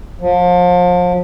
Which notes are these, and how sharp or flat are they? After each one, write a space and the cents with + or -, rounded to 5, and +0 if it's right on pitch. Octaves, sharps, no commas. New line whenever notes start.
F3 +35